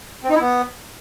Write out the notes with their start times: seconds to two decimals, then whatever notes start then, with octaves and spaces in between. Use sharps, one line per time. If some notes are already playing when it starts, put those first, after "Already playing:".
0.24 C4
0.30 D#4
0.35 E4
0.41 B3